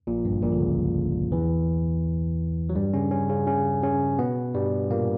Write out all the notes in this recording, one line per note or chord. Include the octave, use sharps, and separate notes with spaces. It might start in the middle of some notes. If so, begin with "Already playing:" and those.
A#1 A#2
G1 G2
A#1 A#2
D3
C#2 C#3
E2 E3
F#3
G2 G3
C#3 C#4
C#3 C#4
C#3 C#4
C#3 C#4
C#3 C#4
B2 B3
G2 G3
A#2 A#3